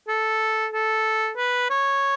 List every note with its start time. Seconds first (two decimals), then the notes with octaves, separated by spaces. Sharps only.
0.08 A4
0.72 A4
1.37 B4
1.70 C#5